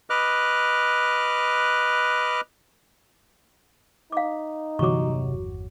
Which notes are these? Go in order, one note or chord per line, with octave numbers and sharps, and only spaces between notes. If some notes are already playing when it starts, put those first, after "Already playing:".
B4 D#5 D6 F6 F#6
D#4 F5 D6
G1 E2 C3 F#3 C#6 D6